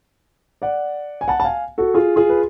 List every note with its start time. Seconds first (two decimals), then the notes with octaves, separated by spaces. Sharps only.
0.62 D5 F#5
1.21 G#5
1.28 F#5 A5
1.40 A5
1.44 F5 G#5
1.78 F#4 A4
1.94 F4 G#4
2.16 F4 G#4
2.29 B4